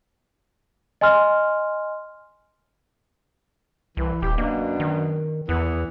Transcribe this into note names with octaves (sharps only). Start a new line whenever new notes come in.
D#5 G#5 C6 F6
C2 E3
D#1 G4
F#2 B2 A#3 D4
D#3
E2 E3 B3